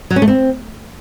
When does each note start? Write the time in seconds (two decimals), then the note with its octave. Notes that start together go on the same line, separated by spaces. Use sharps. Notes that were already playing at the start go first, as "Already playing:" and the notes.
0.10 F#3
0.16 C#4
0.22 A3
0.28 C4